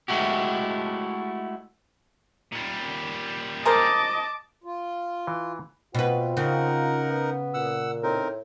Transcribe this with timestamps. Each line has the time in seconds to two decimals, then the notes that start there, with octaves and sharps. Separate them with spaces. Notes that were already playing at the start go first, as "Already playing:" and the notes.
0.08 G#3 A3 E4 F#4 G4
2.52 A#2 G3
3.66 G#4 A#4 C5 D#5 A5 D6
4.64 F4
5.27 E3
5.95 B2 C4 F4 B4
6.37 C#3 D#4 A#4 F#5
7.10 B3
7.54 A#2 F#5 E6
8.03 A2 C4 D#4 A#4